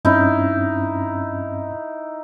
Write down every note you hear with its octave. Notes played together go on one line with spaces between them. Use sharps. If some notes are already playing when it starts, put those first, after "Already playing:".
G2 C4 C#4 D#4 E4